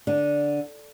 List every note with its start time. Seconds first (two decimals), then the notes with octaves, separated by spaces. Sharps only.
0.07 D3